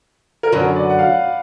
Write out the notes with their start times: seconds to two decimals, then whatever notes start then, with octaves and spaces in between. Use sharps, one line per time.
0.43 A#4
0.52 F#2 D3 F#3 B4
0.76 D5
0.90 F#5
0.99 F5